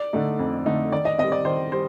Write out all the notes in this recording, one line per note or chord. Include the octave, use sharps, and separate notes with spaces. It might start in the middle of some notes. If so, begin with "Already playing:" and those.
Already playing: D5
D3 A3 D#4
F2
D3 A3 D#4
D#3 D5
D#5
G3 C4 D#5
D5
D#3 C5
G3 C5